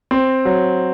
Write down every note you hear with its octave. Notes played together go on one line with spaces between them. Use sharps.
C4
F#3